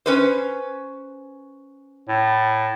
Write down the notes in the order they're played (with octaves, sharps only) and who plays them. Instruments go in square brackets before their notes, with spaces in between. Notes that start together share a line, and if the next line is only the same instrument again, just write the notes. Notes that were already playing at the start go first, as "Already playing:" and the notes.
[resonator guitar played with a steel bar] C#4 B4 C5
[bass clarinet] A2